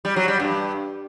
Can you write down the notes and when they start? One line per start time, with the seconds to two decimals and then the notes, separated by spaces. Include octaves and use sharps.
0.05 G3
0.16 F#3
0.28 G3
0.40 G2